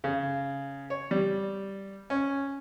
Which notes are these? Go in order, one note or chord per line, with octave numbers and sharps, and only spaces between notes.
C#3
C#5
G3
C#4